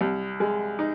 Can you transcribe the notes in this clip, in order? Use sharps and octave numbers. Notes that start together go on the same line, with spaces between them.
C2
G#3
D#4